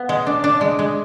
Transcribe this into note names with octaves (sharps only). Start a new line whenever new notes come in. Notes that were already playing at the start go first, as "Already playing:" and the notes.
Already playing: B3
G#3
D4
D4
G#3
G#3